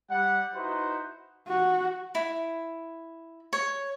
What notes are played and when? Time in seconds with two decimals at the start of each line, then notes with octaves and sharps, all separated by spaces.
0.11 G3 F#5
0.55 D#4 E4 F#4 B4 C5 F#5
1.48 F#4
2.15 E4
3.53 C#5